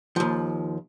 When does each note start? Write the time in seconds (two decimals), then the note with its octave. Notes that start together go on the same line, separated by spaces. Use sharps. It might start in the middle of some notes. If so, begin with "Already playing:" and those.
0.16 D#2 F3